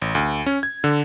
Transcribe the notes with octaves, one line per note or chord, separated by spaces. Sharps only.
A1
D2
C#4
G#6
D3